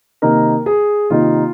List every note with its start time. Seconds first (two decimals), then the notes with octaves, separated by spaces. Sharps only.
0.22 C3 D#3 A#3 D#4 A#4
0.66 G#4
1.10 C3 D#3 A#3 D#4 F4